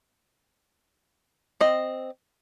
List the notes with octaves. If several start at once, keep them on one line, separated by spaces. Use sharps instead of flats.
C4 D#5